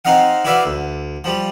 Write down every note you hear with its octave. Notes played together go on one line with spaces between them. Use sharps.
C4 D#4 D#5 F5 F#5
E4 F#4 B4 D5 E5 F5
D2
F3 G3